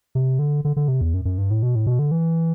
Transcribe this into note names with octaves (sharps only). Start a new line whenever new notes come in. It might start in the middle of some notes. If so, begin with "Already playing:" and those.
C3
D3
D3
D3
C3
E2
F#2
F#2
G2
A2
B2
A2
B2
D3
E3